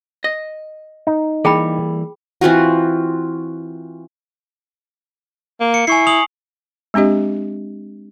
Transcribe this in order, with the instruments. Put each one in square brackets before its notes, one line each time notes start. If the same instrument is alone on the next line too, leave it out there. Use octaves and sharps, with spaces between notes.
[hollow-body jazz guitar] D#5
[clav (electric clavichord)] D#4
[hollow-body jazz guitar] E3 G3 A#3 [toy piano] G#4 G5 B5
[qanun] E3 C4 F4 F#4
[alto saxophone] A#3
[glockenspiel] C#7
[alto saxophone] E4 [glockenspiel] G#5 C#6 C7
[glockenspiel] D#6 F7 F#7
[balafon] G#3 C4 D4 G4 D#5